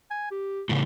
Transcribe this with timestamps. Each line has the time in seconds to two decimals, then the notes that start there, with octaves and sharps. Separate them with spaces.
0.11 G#5
0.31 G4
0.69 A2 C#3